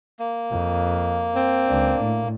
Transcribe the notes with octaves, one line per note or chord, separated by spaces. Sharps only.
A#3
F2
C4
C#2 D4
A2